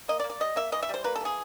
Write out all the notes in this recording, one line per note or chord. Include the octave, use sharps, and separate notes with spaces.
A#3 D#5
D5
A#3
D5
G3 D#5
A#3 E5
E3 D#5
E5
G3 C5
A#3 B4
A4
E3 G#4